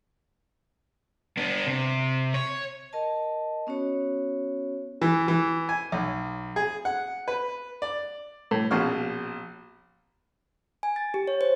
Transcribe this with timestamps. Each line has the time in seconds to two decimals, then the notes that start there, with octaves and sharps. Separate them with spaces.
1.37 B3 D4
1.66 C3
2.34 C#5
2.93 A#4 D#5 A5
3.67 B3 C#4 F#4 C#5
5.02 E3
5.28 E3
5.69 G#5
5.92 B1
6.56 G#4
6.85 F#5
7.28 B4
7.82 D5
8.51 A2
8.71 A#1 B2 C#4 F5 F6
10.83 G#5
10.96 A6
11.14 G4
11.27 C#5
11.41 C5